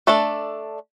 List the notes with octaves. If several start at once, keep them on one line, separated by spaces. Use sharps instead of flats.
A3 D4 A4 D5